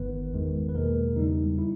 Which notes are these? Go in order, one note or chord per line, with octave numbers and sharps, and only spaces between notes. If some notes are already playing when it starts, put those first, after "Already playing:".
Already playing: G1 G2 D#3 B3 B4
E2 D#3 G#3
B4
E2 B2 G#3 A#3 A#4
E2 C#3 G3 D#4
E4